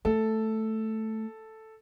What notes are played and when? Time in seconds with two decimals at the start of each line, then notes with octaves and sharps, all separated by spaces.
0.05 A3 A4